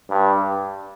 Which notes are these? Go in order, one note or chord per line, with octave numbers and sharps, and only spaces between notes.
G2